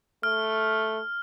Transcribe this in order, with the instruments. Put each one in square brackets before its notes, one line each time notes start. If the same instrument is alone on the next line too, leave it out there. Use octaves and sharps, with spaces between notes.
[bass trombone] A3 [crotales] F6